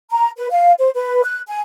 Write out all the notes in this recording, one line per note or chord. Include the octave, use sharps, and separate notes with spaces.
A#5
B4
F5
C5
B4
F#6
G#5